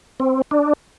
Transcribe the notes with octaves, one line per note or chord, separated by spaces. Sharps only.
C4
D4